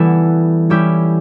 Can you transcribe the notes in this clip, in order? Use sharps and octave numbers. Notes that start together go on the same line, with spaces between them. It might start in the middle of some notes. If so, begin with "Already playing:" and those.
Already playing: E3 G3 B3 E4 A4
G3 C#4 E4 G4